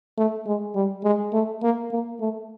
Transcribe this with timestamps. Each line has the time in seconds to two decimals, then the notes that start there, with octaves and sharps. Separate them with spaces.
0.18 A3
0.47 G#3
0.75 G3
1.04 G#3
1.33 A3
1.63 A#3
1.91 A#3
2.20 A3